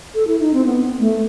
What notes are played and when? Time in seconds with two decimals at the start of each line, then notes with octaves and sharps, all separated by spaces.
0.15 A4
0.27 E4
0.40 D#4
0.54 C4
0.66 B3
1.00 A3